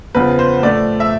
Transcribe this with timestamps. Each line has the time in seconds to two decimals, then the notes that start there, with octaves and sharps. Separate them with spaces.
0.15 E2 C#3 F3 B4
0.39 C5
0.62 A2 F3 A3 D5
1.00 E5